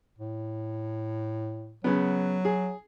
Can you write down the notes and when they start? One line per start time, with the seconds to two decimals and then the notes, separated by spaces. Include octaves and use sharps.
0.19 A2
1.84 C#3 F#3 B3
2.45 G#4